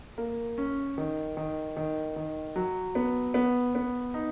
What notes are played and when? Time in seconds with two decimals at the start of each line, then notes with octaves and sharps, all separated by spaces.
0.18 A#3
0.58 C#4
0.98 D#3
1.37 D#3
1.77 D#3
2.16 D#3
2.56 F#3
2.95 B3
3.34 B3
3.75 B3
4.14 D#4